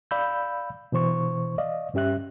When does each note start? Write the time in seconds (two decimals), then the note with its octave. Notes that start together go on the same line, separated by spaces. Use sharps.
0.11 D5 F5 B5 E6 G6
0.92 B2 E3 C5 C#6
1.58 D5 D#5 F5
1.94 G2 C#4 G4 E5 F#6